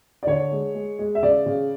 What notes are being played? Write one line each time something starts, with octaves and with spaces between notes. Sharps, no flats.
D5
D3 C#5
G#3
G#3
G#3
E5
C#3 D5
C#3